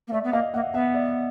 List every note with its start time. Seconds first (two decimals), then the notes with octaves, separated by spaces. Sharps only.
0.08 A#3
0.12 A3 D5 E5
0.24 B3
0.33 A#3 D#5 F5
0.54 A#3 E5 F#5
0.74 B3 E5 F#5
0.94 D5 E5